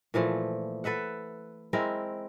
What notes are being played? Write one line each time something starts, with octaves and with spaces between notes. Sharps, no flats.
A#2 E3 F3 A3
A4 B4 E5 F#5
G#3 C4 E4 A#4